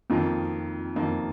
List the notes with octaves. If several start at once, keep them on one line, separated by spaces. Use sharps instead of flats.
F2 D#3 A#3 F4
F2 D#3 A#3 F4